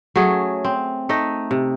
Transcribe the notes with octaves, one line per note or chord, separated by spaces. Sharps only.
F#3 A3 C#4 G#4
C4
A3 D#4 D#5
C3